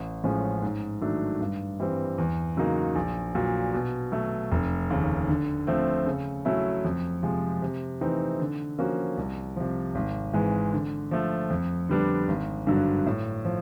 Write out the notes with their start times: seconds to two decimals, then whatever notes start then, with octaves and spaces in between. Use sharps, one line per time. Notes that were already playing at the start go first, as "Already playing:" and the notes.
Already playing: A1
0.24 A2 F3 G#3 C#4
0.62 G#2
1.01 D#3 F#3 A3 D4
1.41 G2
1.80 E3 G3 C4
2.18 E2
2.57 C#3 F#3 A#3 D#4
2.96 A#1
3.35 A#2 F#3
3.74 B2
4.12 F#3 A3
4.52 F1
4.90 D#2 C#3
5.29 D3
5.67 F3 A3 C4
6.06 C#3
6.45 F#3 A3 C#4 E4
6.84 F2
7.23 C3 F3 G#3
7.62 C3
8.01 E3 A3 C4 D#4
8.40 D3
8.79 F3 A#3 C#4 F#4
9.17 C2
9.56 C3 F3
9.95 G#1
10.33 G#2 E3 G#3
10.73 D3
11.11 F3 A3
11.50 F2
11.89 D3 G3 B3 D4
12.28 G#1
12.67 G2 D3 F#3
13.06 A2
13.45 F3